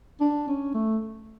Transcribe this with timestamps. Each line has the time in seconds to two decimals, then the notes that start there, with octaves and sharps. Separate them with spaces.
0.21 D4
0.48 C#4
0.74 A3